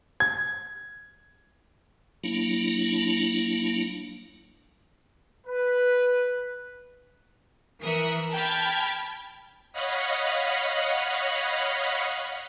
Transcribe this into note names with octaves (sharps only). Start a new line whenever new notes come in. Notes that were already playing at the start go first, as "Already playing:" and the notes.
G#6
F#3 A#3 D4 E4
B4
E3 A#4 E5 D#6 F#6 C#7
G5 A5 B5 F6 G#6 A6
C#5 D#5 F5 F#5 B5